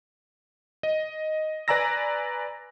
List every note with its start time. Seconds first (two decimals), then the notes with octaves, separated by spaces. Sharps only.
0.83 D#5
1.68 B4 D5 G#5 A#5 E6 A#6